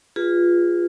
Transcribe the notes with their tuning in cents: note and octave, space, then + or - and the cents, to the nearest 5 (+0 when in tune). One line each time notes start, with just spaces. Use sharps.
F4 +0 G#4 -25 B4 +0